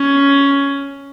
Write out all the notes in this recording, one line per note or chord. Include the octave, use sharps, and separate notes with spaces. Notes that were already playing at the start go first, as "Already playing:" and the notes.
Already playing: C#4